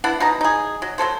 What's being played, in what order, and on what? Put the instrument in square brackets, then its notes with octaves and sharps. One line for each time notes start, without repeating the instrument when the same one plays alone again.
[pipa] B3 D4 E4 F#5
B2 D#4 A#5
D#4 G#4
F#3
F#3 B3 A4 C5